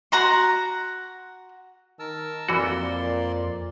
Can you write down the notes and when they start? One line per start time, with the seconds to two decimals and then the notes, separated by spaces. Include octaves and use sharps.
0.12 F#4 F#5 A#5 C6
1.99 D#3 A#4 A5 E6
2.49 F2 A#2 E3 F#4 D5 C6